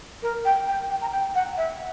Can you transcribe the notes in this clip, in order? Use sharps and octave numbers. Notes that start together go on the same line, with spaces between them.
A#4
G5
G5
G5
A#5
G5
F#5
E5